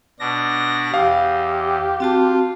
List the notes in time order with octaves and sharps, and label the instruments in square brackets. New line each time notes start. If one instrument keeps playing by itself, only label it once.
[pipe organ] B2 D4 A#6
[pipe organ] E2 [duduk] G4 [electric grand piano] F5 D#6
[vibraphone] C4 F#4 A5 [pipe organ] F4